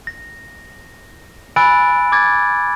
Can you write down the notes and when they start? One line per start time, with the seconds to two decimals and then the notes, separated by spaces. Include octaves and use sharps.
0.07 A#6
1.56 G#5 B5 E6 F#6 A6 D7
2.12 D6 G#6 A6